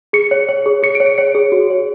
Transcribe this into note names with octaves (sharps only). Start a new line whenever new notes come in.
G#4 C#7
C#5
C#5
G#4
G#4 C#7
D7
C#5
D7
C#5 C#7
G#4
F#4
C#5